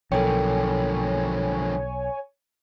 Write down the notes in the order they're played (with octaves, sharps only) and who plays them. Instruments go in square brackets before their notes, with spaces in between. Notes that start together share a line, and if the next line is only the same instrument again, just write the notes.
[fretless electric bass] B1 [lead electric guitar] D3 F3 [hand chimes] A4 A#4 G5 [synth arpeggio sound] C#5 G#5